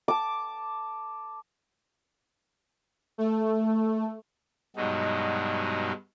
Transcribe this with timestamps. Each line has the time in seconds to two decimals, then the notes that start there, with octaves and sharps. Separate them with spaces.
0.08 A5 D6
3.18 A3
4.76 G2 B2 F#3 G#3 D#4